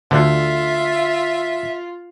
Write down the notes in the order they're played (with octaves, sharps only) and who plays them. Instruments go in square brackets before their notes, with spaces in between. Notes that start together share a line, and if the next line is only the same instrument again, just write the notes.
[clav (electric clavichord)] D2 D3 [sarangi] F4 [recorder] E5